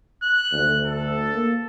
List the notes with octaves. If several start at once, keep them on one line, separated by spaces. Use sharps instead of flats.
F#6
D2
A4
A#3